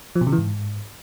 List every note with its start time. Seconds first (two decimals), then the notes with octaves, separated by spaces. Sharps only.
0.16 F3
0.21 B2
0.27 C#3
0.32 E3
0.38 G#2